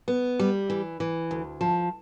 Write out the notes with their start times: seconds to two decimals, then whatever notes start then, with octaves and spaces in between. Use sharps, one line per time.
0.08 B3
0.39 G3
0.70 E3
1.00 E3
1.31 D2
1.61 F3